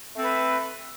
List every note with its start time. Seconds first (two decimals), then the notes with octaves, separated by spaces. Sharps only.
0.13 A3
0.16 C4
0.19 A4
0.22 B4